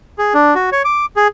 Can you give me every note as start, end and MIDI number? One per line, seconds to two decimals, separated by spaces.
0.18 0.34 68
0.34 0.54 62
0.55 0.70 66
0.72 0.82 73
0.85 1.06 86
1.16 1.28 68